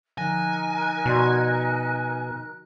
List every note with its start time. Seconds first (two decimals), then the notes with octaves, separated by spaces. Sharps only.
0.18 D3 F3 D#4 A#4 G#5 F#6 A#6
1.05 B2 F#4 D5 C6